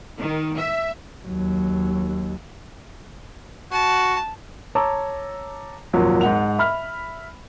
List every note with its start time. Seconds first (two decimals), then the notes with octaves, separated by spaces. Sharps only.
0.19 D#3
0.57 E5
1.24 D#2 F#3
3.72 F#4 A5
4.75 C#5 A5 A#5 D6 E6
5.93 G#1 D#2 A#2 F3 F#3
6.21 G#2 F#5 F7
6.59 E5 B5 F6